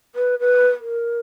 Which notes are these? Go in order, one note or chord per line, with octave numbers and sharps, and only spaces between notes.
B4
B4
A#4